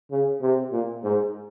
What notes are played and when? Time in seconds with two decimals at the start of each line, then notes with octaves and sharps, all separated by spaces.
0.11 C#3
0.41 C3
0.72 A#2
1.04 G#2